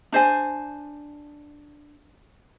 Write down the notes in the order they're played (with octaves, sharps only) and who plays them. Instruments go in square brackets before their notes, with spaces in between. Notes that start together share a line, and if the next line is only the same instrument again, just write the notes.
[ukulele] D4 C5 D#5 G#5